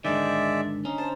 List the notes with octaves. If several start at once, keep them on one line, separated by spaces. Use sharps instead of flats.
G#2 D3 D#3 G#3 D4 D5 E5 G5
C#4 D#4 C6
C5 A5